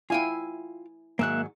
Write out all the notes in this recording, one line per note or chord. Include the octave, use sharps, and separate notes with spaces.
E4 F4 F5 G5 G#5
G#2 D#3 F#3 A#3 E5 F#6